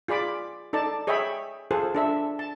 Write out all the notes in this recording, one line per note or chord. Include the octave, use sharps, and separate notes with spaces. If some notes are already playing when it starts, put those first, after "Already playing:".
F4 G#4 D5 B5 D6
D#4 A4 D5 A5
G#4 C#5 D#5 E5 G5 B5
F4 G#4 A4 C5
D4 A4 E5
A5